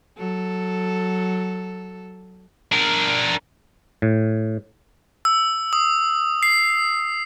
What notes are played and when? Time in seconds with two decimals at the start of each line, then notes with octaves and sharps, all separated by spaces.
0.18 F#3 A4
2.72 D4 A#4
4.02 A2
5.25 E6
5.73 D#6
6.43 C7